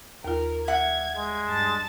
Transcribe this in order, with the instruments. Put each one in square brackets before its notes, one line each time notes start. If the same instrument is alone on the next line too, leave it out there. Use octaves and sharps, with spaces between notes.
[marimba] D#2 F4 [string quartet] A#4
[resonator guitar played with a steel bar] G3 E5 F#5 [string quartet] G#6
[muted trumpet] G#3
[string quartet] G2 A5 A6